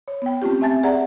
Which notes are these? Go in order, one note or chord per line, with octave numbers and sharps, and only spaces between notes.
C#5
B3 G5
A3 C4 C#4 F4 G4
C4 E5 G#5 A5 A6
G#4 D5 E5 F#5 A#5